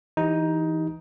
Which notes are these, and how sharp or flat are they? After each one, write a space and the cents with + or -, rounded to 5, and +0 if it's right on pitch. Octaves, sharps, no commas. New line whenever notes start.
E3 +0 D#4 +15 G4 +0